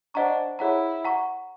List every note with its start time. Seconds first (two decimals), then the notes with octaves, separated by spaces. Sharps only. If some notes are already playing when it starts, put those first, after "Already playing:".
0.14 D4 C5 D#5 F#5 A#5 C#6
0.59 E4 G#4 C#5 F#5 A#5
1.05 F#5 A#5 C#6